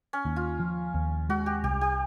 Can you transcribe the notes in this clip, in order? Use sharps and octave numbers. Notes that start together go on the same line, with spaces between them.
C#4
D#2
F4
F3
D#2
G#3 F#4
G4
C2 G4
G4